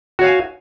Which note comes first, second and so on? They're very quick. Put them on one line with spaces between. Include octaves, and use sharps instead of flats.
F#4 C#5 F5 G#5